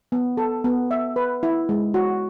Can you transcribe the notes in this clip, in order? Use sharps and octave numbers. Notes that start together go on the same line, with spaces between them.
B3
A4
B3
E5
B4
E4
G#3
F#4